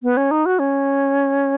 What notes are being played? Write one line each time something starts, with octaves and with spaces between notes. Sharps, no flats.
B3
C#4
D#4
F#4
C#4